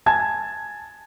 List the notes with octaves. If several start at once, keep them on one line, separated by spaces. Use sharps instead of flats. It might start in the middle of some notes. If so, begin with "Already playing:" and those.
G#5 A5 G#6